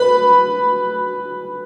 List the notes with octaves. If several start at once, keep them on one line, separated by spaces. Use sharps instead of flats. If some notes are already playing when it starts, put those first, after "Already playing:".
Already playing: B4 B5